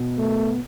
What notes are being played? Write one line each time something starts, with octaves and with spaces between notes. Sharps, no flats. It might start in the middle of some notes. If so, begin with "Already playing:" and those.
Already playing: B2
A3